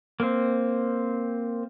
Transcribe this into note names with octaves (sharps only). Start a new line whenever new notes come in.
A#3 C4